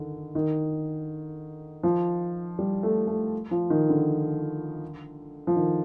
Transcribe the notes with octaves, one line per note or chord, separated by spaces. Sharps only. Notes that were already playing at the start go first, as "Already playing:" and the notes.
Already playing: D3 D#3
D#3
F3
G3
A3
A3
F3
D#3
D3
F3
D#3